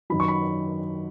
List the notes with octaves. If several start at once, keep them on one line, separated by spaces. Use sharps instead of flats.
F#2 D#3 F#3 B5
C#6
B5